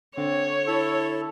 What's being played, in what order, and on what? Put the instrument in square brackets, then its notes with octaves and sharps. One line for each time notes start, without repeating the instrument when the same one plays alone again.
[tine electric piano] D3 [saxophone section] C4 A4 [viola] C#5
[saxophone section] E4 [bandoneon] A4